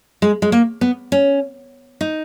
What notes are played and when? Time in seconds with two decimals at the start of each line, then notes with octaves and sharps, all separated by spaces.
0.22 G#3
0.42 G#3
0.52 A#3
0.81 B3
1.12 C#4
2.01 D#4